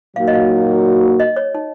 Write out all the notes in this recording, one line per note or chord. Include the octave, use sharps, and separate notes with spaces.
A#2 F#3 A#3 D#4 F#4 F5
D#5
F5
D#5
C#5
D#4